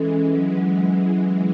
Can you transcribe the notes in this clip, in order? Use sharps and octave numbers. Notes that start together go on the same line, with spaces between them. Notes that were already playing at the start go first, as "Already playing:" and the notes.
Already playing: E3 G#3 C#4 A4
C#4
F#3
F#3
F#3